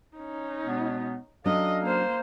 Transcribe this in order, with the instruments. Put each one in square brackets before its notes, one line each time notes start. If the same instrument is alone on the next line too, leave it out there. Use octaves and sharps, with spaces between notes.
[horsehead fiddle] C#4 D#4
[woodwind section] B2 G#3 B3
[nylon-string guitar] F#3 C#4 D4 [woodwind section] A4 D5 F5 [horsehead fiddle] D#5
[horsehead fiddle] A#3 C5